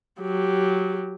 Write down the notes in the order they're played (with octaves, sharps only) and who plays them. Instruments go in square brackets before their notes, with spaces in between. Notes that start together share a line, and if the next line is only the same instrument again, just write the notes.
[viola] F#3 G4